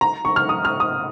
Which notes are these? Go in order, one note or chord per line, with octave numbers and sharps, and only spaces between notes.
A#5
C#6
F6
D#6
F6
D#6